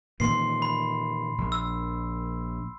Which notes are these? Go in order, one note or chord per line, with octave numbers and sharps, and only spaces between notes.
A#2 D#3 E3 C6 C7
B5
A#1
E6